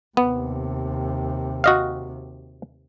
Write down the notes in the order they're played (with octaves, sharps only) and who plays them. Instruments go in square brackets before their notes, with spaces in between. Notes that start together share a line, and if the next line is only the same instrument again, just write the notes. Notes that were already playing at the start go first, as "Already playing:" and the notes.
[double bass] D#2 C3 [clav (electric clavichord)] B3
[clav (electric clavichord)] F#4 D#5 F5